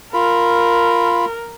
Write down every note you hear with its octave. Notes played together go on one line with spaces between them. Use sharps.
F4 A#4 B5